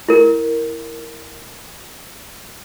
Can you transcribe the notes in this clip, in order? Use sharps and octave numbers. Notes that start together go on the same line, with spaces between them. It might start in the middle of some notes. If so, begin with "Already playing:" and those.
E4 A#4